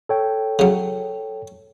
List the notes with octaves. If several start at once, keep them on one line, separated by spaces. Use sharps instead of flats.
A4 C#5 G5
C#3 F#3